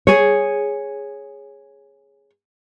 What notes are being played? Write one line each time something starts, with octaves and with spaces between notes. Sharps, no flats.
G#4 C#5